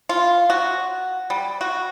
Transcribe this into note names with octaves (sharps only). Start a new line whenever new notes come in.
F4
F#4
G3
F#4